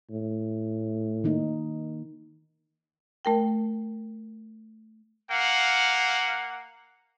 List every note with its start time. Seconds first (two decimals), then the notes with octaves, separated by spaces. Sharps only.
0.11 A2
1.24 D#3 A#3 D#4
3.25 A3 A#4 G5
5.30 A#3 F5 F#5